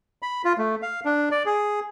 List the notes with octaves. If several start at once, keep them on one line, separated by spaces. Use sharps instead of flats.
B5
F4
A3
F5
D4
D5
G#4